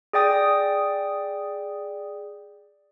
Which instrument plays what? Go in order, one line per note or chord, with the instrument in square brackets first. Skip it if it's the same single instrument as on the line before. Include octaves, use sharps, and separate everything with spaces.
[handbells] G#4 D5 G5 D#6